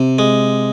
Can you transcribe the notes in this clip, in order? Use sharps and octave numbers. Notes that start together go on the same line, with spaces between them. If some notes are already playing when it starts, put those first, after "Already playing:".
Already playing: C3
G#3